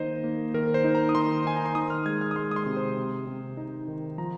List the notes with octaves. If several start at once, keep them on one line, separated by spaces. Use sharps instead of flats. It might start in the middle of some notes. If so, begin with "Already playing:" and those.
Already playing: D#3 A#3 D#4 C5 D#5
A#3
D#3 A#4
C5
D#4
A#5
D#6
D#3 C6
D#4 G#5
A#5
C6
D#3 D#6
F6
G#3 G#6
F6
D#6
G#3 C6
D#6
C6
C3
C5
C3
C3
D#4
D#3
F3 A#5